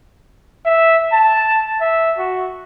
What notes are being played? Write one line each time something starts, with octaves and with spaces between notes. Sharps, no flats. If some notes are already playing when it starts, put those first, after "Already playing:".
E5
A5
E5
F#4